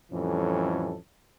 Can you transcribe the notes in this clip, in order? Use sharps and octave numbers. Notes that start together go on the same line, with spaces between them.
F2 A2 E3 G3 C#4 A4